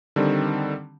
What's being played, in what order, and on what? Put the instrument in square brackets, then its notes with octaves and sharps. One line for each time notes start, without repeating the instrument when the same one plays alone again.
[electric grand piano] D3 D#3 G3 C4